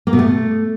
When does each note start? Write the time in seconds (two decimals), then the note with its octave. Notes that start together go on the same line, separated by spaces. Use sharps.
0.07 A#3
0.13 B2
0.19 A3